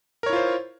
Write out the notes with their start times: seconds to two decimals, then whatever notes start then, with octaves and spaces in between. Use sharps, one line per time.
0.23 A#4
0.26 C#5
0.30 E4
0.33 F4
0.36 C5